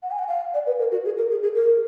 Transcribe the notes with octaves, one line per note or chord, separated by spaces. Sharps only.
F#5
G#5
F#5
F5
D5
B4
A#4
F#4
G#4
A#4
G#4
G#4
A#4